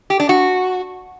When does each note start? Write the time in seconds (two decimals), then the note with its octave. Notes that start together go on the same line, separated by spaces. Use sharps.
0.10 G4
0.20 D4
0.29 F#4